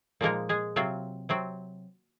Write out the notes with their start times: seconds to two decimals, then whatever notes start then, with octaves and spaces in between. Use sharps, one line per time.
0.21 A#2 F3 G#3 A#3 D#4 A#4
0.49 G#3 G#4
0.76 C3 F#3 C4 F4
1.29 C3 F#3 C4